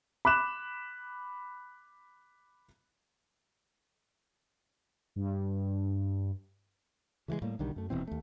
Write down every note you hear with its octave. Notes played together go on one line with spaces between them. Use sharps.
B5 D6 F#6 E7
G2
C#3 E3 F#3 G#3
A2 G3 A#3
B1 D3 D#3 G3
F#2 A3
D#1 B2 E3 C4
D#2 A3